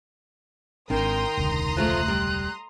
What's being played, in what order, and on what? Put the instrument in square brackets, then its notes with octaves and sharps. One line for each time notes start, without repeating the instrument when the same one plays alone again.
[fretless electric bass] G#1 C4 D4 [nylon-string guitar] D#3 [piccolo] G5 [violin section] A#5 C6 D#6
[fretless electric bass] E1 C#2 D3
[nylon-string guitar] F3 G#3 A3 [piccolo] F#6
[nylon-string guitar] G3